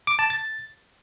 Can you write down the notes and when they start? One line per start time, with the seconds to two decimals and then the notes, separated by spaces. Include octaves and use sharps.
0.07 D6
0.19 A5
0.30 A6